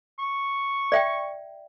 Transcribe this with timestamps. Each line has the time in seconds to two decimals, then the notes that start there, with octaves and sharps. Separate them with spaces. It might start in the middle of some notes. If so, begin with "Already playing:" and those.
0.19 C#6
0.92 D5 E5 G5